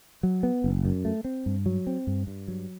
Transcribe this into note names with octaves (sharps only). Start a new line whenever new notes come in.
F#3
B3
F#1
F#2
A3
C4
G2
F#3
C4
G2
G2
F#3